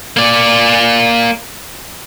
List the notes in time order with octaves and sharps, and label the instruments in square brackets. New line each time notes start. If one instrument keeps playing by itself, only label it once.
[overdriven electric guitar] A#3 D5